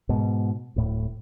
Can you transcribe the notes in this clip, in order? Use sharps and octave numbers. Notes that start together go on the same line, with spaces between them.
G#2 B2
D1 A2